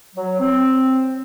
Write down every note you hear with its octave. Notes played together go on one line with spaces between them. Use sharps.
F#3
C4